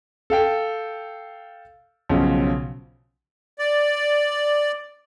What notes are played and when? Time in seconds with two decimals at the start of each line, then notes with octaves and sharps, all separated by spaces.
0.30 A4 F5 G5
2.09 B1 C#3 F3
3.59 D5